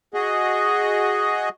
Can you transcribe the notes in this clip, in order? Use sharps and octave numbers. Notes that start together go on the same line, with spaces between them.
F#4 G#4 D#5